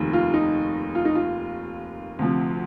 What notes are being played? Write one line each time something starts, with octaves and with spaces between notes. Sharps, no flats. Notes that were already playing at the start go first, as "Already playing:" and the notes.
Already playing: F1 D#2 D#3
F4
D#4
F4
D#4
F4
D2 C3 F3